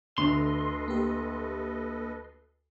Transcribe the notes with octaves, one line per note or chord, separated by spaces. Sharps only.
D2 D3 A4 B4 D#5 C6
A#3 G4